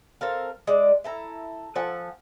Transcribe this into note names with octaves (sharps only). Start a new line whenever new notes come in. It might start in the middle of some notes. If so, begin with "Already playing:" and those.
C4 A4 A#4 F5
G#3 D5
E4 A4 A#5
F3 A4 F#5 G#5